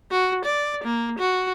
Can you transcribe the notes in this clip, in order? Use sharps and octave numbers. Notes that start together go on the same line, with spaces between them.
F#4
D5
A#3
F#4